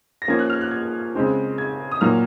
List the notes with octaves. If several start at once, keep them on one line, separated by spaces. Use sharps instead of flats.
A#6
F3 A#3 C#4 G#6
F#6
F6
F#6
G#6
C#3 G#3 C4
G#6
D#6
A#2 F#3 A#3 F6